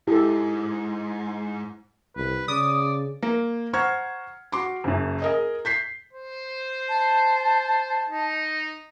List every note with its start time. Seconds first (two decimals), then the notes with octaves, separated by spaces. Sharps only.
0.08 G#2 E4 G4 A4
2.16 C2 B4
2.48 C#3 D5 D#6
3.23 A#3
3.73 C5 F#5 A#5 C#6 F6 G#6
4.52 F#4 C6 D6
4.84 F#1 F#2
5.22 G#4 A#4 D#5
5.65 G6 B6 C7
6.13 C5
6.89 A5
8.10 D#4